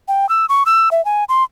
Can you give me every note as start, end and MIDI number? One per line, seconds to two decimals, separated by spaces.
0.08 0.28 79
0.29 0.46 88
0.49 0.63 85
0.66 0.89 88
0.91 1.04 76
1.05 1.24 80
1.29 1.44 84